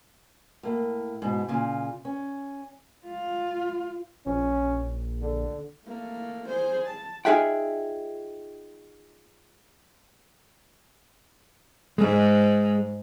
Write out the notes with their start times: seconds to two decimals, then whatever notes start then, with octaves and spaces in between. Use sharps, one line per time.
0.63 A2 A#3
1.22 G#2 B2
1.48 A#2 C#3 F4
2.05 C#4
3.07 F4
4.26 A#1 C#4
5.21 D3
5.85 A3 A#3
6.49 G#4 C5
6.87 A5
7.25 D#4 F4 G#4 E5 F#5 G5
11.98 G#2 G#3